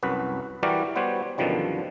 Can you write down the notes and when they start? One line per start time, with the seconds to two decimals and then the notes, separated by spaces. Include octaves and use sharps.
0.03 C2 F#2 F#4 B4
0.63 E3 G3 F#4 G4 A#4 D5
0.96 G3 B3 F#4 C5 C#5
1.38 F#2 B2 D3 D#3 F3 G3